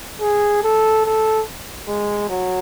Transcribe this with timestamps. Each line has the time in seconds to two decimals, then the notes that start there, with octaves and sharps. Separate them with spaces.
0.21 G#4
0.63 A4
1.05 A4
1.88 G#3
2.29 F#3